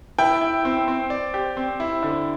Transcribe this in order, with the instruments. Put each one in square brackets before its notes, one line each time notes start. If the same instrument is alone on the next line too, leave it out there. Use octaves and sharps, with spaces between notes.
[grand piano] E4 [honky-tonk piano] G5
[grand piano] E4
C4
C4
D5
G4
C4
E4
D3